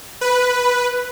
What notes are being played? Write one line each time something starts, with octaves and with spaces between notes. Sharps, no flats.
B4